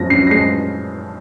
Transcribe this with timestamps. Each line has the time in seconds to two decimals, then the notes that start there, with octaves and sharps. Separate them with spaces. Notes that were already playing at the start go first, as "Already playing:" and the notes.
Already playing: F#2 F3 G#3 A#6
0.10 F#2 C7
0.27 A#6
0.31 G#3 C7